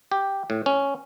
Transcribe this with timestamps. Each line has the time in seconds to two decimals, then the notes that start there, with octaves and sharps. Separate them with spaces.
0.12 G4
0.50 A2
0.66 C#4